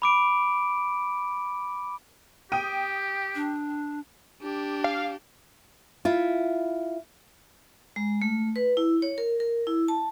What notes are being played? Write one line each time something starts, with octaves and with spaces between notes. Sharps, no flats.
B5 D6 D7
G4 G5 D#6 D#7
D4
D4 G4
F5
E4 F4
G#3
A3
B4
E4
C#5
A#4
A#4
E4
A5